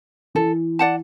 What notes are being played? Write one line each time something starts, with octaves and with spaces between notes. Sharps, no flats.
E3 A4
D5 F#5 A5